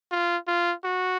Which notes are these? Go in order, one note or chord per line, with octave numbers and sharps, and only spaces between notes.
F4
F4
F#4